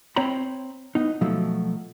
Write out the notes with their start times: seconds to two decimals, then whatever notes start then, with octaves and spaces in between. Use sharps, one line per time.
0.16 C4 C#5 G5 A#5 B5
0.95 B3 D#4
1.21 B2 F3 F#3 A3